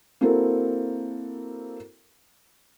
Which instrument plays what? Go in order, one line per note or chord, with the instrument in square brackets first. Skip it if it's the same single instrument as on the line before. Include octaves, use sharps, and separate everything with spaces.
[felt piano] A#3 C4 E4 F#4 A4 A#4